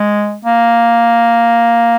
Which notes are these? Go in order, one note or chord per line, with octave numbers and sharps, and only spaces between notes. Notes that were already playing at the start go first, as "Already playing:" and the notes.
Already playing: G#3
A#3